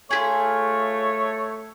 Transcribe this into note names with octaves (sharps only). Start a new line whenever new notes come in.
A3 F4 G4 G#4 C#5